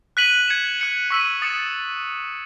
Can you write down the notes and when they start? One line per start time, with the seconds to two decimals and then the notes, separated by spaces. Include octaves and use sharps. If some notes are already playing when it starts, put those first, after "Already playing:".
0.17 F#6 B6 D#7 F#7
0.48 G#6 C#7 E7
0.80 F#6 C#7 F#7
1.10 C#6 E6 B6 D#7 F#7
1.42 D#6 A6 C#7 E7